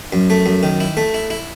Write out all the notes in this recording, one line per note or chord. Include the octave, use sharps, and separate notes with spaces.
F#2
A3
F#2
D#3
E4
A3
E4
E4